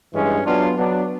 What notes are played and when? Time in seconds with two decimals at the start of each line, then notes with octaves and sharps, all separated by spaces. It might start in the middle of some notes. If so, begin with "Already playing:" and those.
0.13 G2 E3 G#3 C#4
0.45 F#3 B3 D4 F4
0.77 F#3 B3 D4